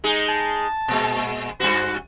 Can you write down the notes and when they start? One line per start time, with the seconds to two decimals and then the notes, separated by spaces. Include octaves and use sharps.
0.04 G#3 D#4 G#4
0.29 A5
0.88 A#2 G#3
1.60 G2 A#2 F#4 C5